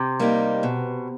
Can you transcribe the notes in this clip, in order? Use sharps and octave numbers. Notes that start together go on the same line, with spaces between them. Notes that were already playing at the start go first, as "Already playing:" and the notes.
Already playing: C3
G3 A#3 D#4 G4
B2